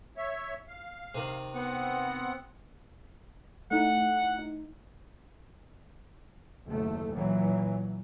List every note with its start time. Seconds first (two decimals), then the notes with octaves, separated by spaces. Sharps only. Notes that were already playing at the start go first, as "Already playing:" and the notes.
0.17 C#5 E5
0.68 F5
1.15 C3 D#3
1.54 B3 C4 F#5
3.71 A3 D#4 E4 F#5
4.39 D#4
6.66 F#1 D#2 A3
7.13 A#2 E3 F#3